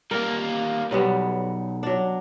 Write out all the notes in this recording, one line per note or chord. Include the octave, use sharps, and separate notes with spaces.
G3 A#3 A#4
B1 F#3 G3 B3
F#3 D4